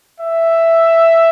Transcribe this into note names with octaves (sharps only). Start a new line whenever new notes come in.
E5